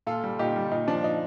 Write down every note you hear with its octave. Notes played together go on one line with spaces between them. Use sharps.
A#2 F4 A4
G3
A#2 D#4 G4
G3
A#2 D#4
F3 D4
A#2 D#4